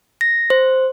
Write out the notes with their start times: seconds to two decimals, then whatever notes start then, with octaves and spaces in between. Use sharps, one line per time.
0.21 A#6
0.50 C5